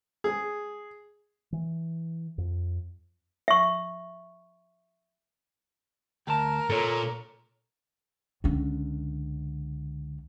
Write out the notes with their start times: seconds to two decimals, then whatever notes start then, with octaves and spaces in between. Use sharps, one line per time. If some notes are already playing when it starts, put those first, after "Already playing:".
0.24 G#4
1.52 E3
2.38 F2
3.48 E5 C#6
6.27 D2 A#4 A5
6.70 A#2 A4 C#5
8.44 C#2 D3